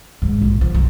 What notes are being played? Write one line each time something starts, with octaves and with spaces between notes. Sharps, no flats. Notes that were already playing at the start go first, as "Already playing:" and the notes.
G#2
A#1
F3
B1